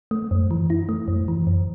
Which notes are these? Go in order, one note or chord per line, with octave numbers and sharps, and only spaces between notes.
A3
F#2
E3
E4
A3
F#2
E3
F#2